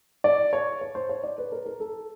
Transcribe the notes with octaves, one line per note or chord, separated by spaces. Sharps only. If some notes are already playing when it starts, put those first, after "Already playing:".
D5
C#5
C#5
C5
C#5
D5
B4
A#4
A#4
A4